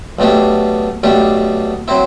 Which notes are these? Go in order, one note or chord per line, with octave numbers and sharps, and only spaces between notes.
B1 B2 A3 D4 G4
B1 B2 A3 D4 G4
F#3 C4 E4